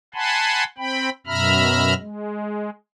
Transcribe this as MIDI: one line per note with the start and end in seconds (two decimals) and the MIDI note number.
0.14 0.64 78
0.14 0.64 80
0.14 0.64 81
0.14 0.64 83
0.14 0.64 84
0.78 1.10 60
0.78 1.10 79
0.78 1.10 83
1.27 1.94 42
1.27 1.94 47
1.27 1.94 76
1.27 1.94 82
1.27 1.94 83
1.27 1.94 89
2.00 2.70 56